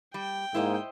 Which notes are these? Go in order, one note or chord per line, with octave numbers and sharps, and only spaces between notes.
G3 G5
G#2 A#3 E4 C5 D#5